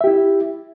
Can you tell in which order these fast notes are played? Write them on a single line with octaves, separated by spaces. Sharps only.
E5 G4 E4